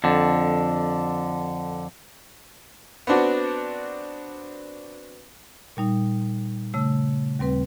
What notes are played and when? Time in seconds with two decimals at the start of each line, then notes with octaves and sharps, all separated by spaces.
0.04 F2 D3
3.07 B3 C4 D4 F#4
5.77 A#2 G3 D#4
6.74 C#3 A3 E6
7.39 D#2 G3 C4 B4